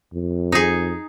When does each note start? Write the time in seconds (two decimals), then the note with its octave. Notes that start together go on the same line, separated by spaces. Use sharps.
0.14 F2
0.52 D#4 G#4